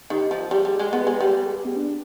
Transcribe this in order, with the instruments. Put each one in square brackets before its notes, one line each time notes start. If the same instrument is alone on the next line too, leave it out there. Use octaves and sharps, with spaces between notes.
[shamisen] D#3 [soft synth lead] G4
[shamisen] F3
[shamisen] G3 [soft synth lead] G#4
[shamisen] G3
G#3
[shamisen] B3 [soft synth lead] G#4
[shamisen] G#3 [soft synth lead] B4
[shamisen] G3 [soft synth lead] B4
[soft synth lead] B4
G#4
G4
B3
D4